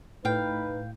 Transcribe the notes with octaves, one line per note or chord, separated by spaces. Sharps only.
A2 D#4 B4 F5 G5